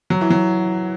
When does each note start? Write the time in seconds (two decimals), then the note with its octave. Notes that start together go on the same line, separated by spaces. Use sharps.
0.10 F#3
0.21 E3
0.30 F#3